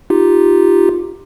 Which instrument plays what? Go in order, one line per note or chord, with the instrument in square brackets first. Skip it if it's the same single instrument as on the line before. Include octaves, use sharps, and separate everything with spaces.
[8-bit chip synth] D#4 F4 G4